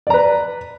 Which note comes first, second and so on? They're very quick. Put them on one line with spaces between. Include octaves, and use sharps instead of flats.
D5 A#5 B4